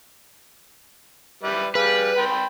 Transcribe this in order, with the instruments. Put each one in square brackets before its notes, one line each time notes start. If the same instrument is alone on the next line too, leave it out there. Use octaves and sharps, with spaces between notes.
[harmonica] G3 B4 E5
[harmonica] G3 G#4 F5 [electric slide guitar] B4
[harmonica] G5 B5 C6